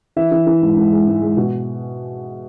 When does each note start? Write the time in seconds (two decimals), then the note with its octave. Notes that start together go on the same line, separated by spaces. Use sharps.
0.16 E3 E5
0.32 E3
0.47 E3
0.62 G#2
0.77 G#2
0.92 G#3
1.07 G#2
1.22 G#3
1.37 B2